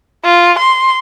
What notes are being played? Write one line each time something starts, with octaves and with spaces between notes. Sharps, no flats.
F4
C6